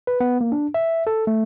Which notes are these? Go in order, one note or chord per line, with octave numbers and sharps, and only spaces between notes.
B4
B3
A#3
D4
E5
A4
A3